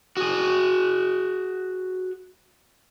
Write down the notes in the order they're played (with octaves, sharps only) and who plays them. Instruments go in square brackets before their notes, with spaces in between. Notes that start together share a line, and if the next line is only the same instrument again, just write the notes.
[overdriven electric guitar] F#4 G#4